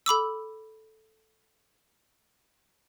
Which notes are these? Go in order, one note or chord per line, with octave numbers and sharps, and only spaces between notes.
A4 B5 D6 E6